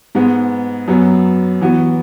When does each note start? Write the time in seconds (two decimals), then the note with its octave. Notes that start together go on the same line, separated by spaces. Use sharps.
0.15 G#2 G#3 B3
0.88 F#2 F#3 B3
1.61 E3 B3 F#4